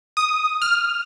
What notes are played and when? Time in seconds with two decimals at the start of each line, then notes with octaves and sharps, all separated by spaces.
0.17 D#6
0.62 F6